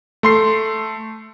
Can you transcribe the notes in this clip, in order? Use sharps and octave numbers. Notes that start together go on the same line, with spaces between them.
A3 C6 C7